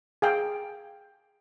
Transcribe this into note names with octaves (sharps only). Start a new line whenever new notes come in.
G#4 F5 G5